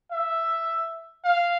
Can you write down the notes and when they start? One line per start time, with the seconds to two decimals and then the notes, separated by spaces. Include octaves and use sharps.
0.12 E5
1.24 F5